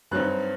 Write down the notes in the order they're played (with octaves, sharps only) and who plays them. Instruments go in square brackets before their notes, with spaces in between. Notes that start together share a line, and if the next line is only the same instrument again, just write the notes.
[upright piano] G2 F#3 C4 D#4 F#6